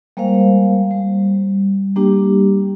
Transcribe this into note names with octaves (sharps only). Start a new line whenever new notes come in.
G3 G#3 A#3 A#4 C5 F5
G3
G3 A#3 D4 G4